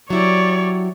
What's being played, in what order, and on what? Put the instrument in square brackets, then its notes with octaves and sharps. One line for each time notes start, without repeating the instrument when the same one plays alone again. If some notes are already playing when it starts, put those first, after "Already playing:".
[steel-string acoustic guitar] F#3 E4 G4 [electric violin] C#5 D5